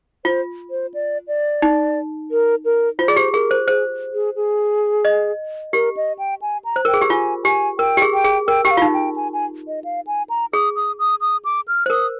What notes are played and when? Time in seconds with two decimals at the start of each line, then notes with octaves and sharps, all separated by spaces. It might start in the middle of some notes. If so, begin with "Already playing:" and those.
0.25 F4 C5
0.71 C5
0.94 D5
1.28 D5
1.62 D#4
2.31 A#4
2.65 A#4
2.99 F4 C5
3.08 G#4 D5
3.16 G4 C5
3.33 G#4 A#4
3.51 C5
3.68 G#4 C5
4.14 G#4
4.36 G#4
5.05 D#5
5.73 G4 A#4
5.97 D#5
6.19 G5
6.42 G#5
6.65 A#5
6.76 C5
6.85 A#4 G5
6.94 G#4
7.01 G4
7.10 F4 G#5
7.45 G4 G#5
7.79 A#4 G5
7.97 G4
8.02 G#4
8.14 G5
8.24 G#4
8.48 A#4 G5
8.65 G4 G5
8.71 F5
8.77 F4
8.82 D#4
8.94 G5
9.16 G#5
9.33 G#5
9.68 D#5
9.84 F5
10.07 G#5
10.30 A#5
10.53 G#4 D#6
10.76 D#6
10.99 D#6
11.21 D#6
11.45 D6
11.68 F6
11.86 C5
11.90 A#4 D#6